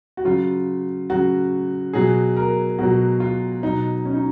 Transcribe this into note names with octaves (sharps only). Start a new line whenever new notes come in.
F#4
C#3 F#3 F4
C#3 F#3 F#4
B2 F#3 G#4
A#4
B2 F#3 F#4
F4
B2 F#3 D#4
C#4
D#4